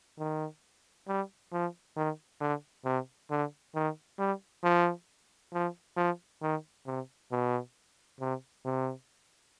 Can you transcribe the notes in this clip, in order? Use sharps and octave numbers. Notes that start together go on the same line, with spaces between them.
D#3
G3
F3
D#3
D3
C3
D3
D#3
G3
F3
F3
F3
D#3
C3
B2
C3
C3